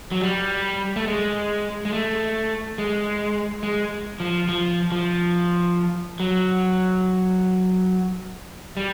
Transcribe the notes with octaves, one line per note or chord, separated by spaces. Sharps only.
F#3
G3
A3
G#3
G#3
A3
G#3
G#3
F3
F3
F3
F#3
G3